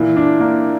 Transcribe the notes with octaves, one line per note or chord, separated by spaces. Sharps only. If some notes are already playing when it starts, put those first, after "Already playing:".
Already playing: A#2 E3
D4
A#3